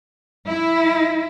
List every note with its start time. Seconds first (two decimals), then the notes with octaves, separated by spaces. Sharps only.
0.48 E4